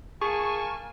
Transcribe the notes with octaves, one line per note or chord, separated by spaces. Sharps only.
A#3 G#4 G#5 A5 C#6